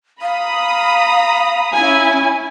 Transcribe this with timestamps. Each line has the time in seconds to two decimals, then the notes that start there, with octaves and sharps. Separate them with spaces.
0.22 F5 A#5 B5 D#6
1.73 C#4 E4 G#5